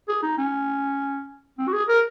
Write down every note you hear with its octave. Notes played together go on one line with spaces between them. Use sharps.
G#4
D#4
C#4
C4
F#4
G#4
A#4